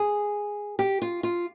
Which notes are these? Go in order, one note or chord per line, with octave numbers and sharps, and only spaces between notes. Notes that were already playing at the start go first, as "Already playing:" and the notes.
Already playing: G#4
G4
F4
F4